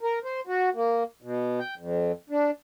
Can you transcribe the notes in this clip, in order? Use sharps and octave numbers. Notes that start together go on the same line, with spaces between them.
A#4
C5
F#4
A#3
B2
G5
F2
D4